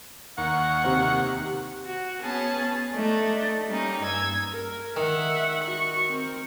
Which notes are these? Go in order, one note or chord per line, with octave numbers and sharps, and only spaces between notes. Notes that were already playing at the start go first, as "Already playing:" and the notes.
D#2 A#3 F#5 C#6
C3 C4
F#4
B3 C#4 G#4 A5
A3 D4 D#4
G3 A#3 C#4 D#4
G2 E6 G#6
A#4
D#3 E5 F#5
F#4 C#6
C4 A#4